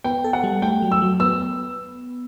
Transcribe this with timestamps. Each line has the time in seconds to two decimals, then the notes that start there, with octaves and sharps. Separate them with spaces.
0.04 B3 G5
0.24 A4
0.33 F#5
0.44 G3
0.62 A3 G5
0.82 F#3
0.92 E6
1.02 F#3
1.20 B3 E6